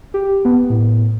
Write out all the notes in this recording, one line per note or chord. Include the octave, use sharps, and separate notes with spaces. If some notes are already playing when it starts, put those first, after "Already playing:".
G4
B3
A2